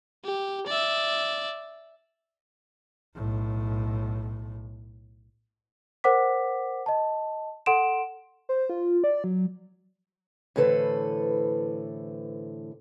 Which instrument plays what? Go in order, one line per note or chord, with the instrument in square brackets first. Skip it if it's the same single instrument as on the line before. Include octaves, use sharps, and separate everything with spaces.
[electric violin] G4
D5 E5
[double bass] B1 A2
[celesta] A#4 C5 F#5 D6 B6
D#5 A5
A4 F#5 C6 D7 E7
[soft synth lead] C5
F4
D5
F#3
[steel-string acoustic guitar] A2 D3 E3 A4 B4 C5